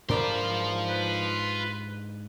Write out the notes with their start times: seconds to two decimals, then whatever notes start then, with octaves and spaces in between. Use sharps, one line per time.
0.09 G#2 D4 F4 A#4 C5 D5 B5
0.89 B4